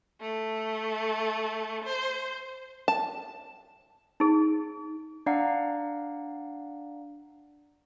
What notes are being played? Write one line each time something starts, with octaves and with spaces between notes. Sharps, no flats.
A3
C5
A5
D#4 G#4
D4 D5 F5 F#5 A#5 C7